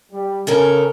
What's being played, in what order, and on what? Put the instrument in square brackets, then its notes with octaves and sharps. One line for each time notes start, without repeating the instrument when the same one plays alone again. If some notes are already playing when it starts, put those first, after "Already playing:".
[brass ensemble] G3
[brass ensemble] C#3 [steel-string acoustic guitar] C#4 A4 A#4